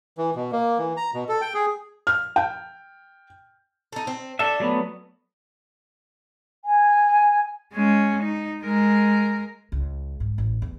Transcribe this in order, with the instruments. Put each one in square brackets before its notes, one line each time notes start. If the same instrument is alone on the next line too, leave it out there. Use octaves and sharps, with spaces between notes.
[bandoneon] E3
B2
A#3
E3
A#5
B2
A4
G5
G#4
[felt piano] F6
G5
[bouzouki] D#4 A4
C4
[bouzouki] D4 [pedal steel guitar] A4 E5
[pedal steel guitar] F#3 A3 B3
[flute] G#5
[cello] G#3 C#4
D#4
G#3 A#4
[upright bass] C#2
G#2
A1
E2